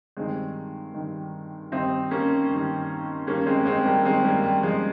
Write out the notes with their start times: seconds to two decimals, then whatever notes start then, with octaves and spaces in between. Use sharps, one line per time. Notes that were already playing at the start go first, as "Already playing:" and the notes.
0.17 G2 D#3 G#3 C4
0.94 G2 D#3
1.72 G2 D#3 C4 D#4
2.11 A#3 C#4
2.49 G2 D#3
3.27 G2 D#3 A#3 C#4
3.46 G#3 C4
3.65 G#3 C4
3.85 G3 A#3
4.05 G2 D#3 G#3 C4
4.24 G3 A#3
4.44 G3
4.62 F3 G#3